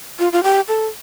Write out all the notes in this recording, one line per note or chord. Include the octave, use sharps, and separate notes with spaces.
F4
F4
G4
A4